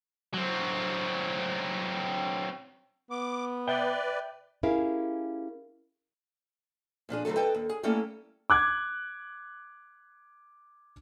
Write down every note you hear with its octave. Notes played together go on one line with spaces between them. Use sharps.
F#3 C4
B3 D6
B4 D5 E5 G5
C#4 E4 G4 G#4 A#4 F5
A#2 F3 D4 G#4
D3 E3 F#3 A3 A4
A4 B4 D#5 G5 A5
D#2
G#4
G3 A3 A#3 C#4 E4 A4
D6 F#6 G#6